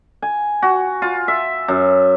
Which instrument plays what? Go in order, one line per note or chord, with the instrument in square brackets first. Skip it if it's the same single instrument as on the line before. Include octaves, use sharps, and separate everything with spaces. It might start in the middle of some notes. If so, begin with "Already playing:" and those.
[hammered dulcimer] G#5
F#4
F4
E5
F#2